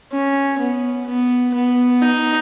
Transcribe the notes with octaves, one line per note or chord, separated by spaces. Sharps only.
C#4
B3
B3
B3
D#4